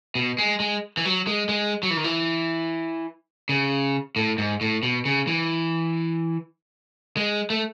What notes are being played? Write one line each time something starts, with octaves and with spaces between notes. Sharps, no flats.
B2
G#3
G#3
E3
F#3
G#3
G#3
F#3
E3
D#3
E3
C#3
A2
G#2
A2
B2
C#3
E3
G#3
A3